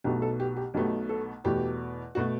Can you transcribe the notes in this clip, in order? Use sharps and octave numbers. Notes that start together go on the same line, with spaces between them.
B1 B2 A3 G4
A4
G4
G4
B1 B2 A3 G4
A4
E2 B2 A3 G4
B2 A3 F#4